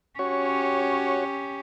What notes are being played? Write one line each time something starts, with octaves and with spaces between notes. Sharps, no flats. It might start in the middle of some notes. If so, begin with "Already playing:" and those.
C#4 F#4 G4 C#5